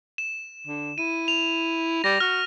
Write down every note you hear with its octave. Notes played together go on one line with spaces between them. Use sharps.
E7
D3
E4 D#7
F7
G3 A#6
F#4 F6